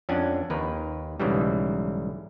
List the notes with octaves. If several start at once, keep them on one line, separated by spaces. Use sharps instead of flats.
F2 C#4 D4 F#5 G#5
D#2 A#4 B4
B1 G#2 C#3 E3 G3